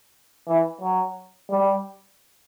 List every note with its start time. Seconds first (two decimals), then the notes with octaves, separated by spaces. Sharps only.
0.47 E3
0.81 F#3
1.50 G3